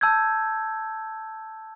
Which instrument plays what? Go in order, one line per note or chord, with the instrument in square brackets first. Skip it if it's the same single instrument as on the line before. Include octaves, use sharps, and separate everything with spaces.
[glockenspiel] A5 E6 G6 G#6